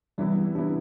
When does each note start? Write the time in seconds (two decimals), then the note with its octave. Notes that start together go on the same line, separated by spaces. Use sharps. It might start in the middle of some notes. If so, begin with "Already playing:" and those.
0.18 C3 E3 G3 B3 E4
0.55 C3 E3 B3 D4 E4